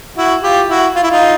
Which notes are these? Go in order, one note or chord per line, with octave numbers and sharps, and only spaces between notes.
E4 F#4
F4 G4
E4 F#4
F4
E4
D#4 F4